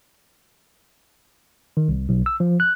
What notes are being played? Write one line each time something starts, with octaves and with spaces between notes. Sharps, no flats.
D#3
C2
B1
E6
F3
F#6